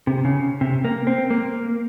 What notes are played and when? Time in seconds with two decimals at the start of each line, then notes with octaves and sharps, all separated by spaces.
0.07 C3
0.25 C#3
0.61 C3
0.85 A#3
1.07 C4
1.30 A#3